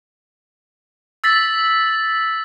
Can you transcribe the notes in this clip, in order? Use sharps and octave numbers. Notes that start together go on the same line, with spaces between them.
E6 A6 B6 F#7